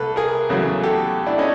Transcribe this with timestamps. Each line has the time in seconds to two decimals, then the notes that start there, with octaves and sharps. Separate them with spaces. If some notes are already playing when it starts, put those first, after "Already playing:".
Already playing: C2 A4 B4
0.16 G#4 A#4
0.50 E2 C#3 F#3 A3
0.83 G4 A4
1.27 D4 E4
1.38 C#4 D#4